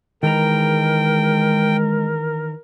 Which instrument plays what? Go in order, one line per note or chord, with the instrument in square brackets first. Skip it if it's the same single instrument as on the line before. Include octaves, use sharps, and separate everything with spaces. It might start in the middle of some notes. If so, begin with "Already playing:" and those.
[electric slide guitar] D#3 E3 A#5 [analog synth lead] G#3 [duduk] A#4 [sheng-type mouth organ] G5